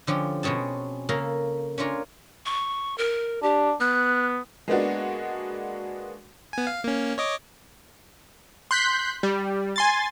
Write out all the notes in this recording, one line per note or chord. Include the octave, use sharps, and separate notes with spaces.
D3 F3 C#4 G4
B2 C4 C#4 G#4 A5
C#3 A#3 A4 A#4
C#4 D4 F4 A#4 C#5
C#6
A#4
D4 G4
B3 F#6
G#3 A#3 B3 D4 F#4
B3 G#5
F5
A#3 C#4
C#5 D#5 D6
C6 F#6 G6 B6
G3
G#5 C6 A6